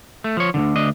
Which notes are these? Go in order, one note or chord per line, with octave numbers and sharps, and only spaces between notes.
A3
F3 C#5
D2 G2 D3
D2 D4 D#5